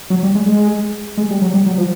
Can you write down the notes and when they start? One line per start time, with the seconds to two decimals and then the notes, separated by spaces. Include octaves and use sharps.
0.10 F#3
0.23 G3
0.35 G#3
0.46 G#3
1.17 G#3
1.31 G3
1.42 F#3
1.54 G3
1.66 F#3
1.78 F3